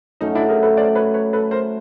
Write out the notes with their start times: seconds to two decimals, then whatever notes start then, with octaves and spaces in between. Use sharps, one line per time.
0.21 F#3 A3 C#4 D#4
0.35 D4 E4
0.49 G#4 A#4
0.62 A4 B4
0.77 C5 D5
0.95 B4 C#5
1.14 B4 C#5
1.33 A4 B4
1.51 A#4 C5